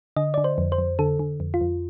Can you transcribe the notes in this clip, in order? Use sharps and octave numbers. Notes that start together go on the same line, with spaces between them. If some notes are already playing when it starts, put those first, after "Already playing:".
D3 D#5
D3 D5
C5
F2
C5
F2
D3 A4
D3
F2
F4
F2